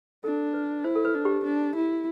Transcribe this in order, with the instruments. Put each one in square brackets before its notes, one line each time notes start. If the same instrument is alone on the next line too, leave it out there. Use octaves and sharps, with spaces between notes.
[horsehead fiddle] D4 [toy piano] A4
[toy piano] B4
[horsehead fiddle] E4 [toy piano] C5
[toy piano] A4
B4
[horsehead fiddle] D4
[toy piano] G4
[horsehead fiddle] D4
E4